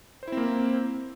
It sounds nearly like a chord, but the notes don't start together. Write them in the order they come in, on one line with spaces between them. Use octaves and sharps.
C5 E4 C4 A#3